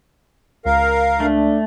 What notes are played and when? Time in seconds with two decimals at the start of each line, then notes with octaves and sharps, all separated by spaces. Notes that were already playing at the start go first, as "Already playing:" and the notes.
0.65 C#2 A#4 F5
1.20 A3 D4